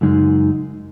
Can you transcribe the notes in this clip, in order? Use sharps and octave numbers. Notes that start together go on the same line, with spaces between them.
F#2 C#3 G#3 D#4